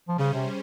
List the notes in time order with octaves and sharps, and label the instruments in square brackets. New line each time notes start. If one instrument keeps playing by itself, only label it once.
[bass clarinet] F3
[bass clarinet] C#3 [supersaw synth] G3 C#4 G#4 C5
[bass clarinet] C3